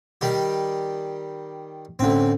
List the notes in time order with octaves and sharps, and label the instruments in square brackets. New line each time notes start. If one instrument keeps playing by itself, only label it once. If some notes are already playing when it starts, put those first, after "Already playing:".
[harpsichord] D#3 G3 G4
[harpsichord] D2 C4 [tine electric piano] A2 C#4